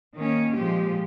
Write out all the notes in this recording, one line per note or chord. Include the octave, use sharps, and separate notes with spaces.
D#3 A#3 C#4
A#2 F3 G#3 G4